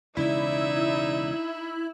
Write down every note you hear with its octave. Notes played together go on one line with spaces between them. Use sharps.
E1 C#3 G#3 D#4 E4 D5 E5